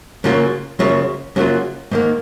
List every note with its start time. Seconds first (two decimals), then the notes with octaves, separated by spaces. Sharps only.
0.24 F#2 C#3 F#3 A#3 F4
0.79 F#2 C#3 F#3 A#3 F4
1.36 F#2 C#3 F#3 A#3 F4
1.91 G#2 D#3 A#3